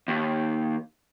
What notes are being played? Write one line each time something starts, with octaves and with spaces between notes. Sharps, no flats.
D#2